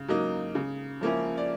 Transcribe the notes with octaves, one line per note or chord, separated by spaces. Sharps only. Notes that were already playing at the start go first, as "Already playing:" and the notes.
Already playing: C#3
F#3 A#3 D#4
C#3
F3 A#3 C#4 E4
D5